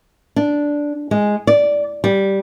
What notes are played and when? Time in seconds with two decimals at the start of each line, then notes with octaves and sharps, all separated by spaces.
0.36 D4
1.11 G#3
1.47 D5
2.04 G3